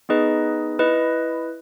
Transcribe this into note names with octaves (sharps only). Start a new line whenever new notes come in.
B3 D#4 G#4 B4 D#5
E4 B4 D#5